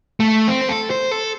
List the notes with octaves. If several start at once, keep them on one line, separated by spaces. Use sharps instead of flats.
A3
C4
C5
A4
C5
A4